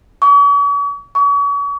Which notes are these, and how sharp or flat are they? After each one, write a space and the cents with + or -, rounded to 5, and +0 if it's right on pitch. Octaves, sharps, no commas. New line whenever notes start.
C#6 +45
C#6 +40